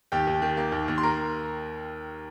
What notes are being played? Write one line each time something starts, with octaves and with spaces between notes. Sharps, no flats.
D#2 G4 G5
D#2
D#3
A#3
D#2
D#2
C6
A#4 A#5